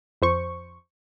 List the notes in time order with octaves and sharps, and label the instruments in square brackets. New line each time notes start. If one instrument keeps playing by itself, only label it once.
[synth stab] F2 C5 C#6